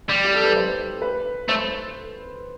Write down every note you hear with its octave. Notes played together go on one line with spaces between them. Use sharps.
G3
G4
A4
B4
C5
B4
A3 C5